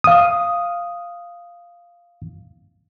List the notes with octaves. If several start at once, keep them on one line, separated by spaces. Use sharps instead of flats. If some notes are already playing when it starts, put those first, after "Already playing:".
F5 D#6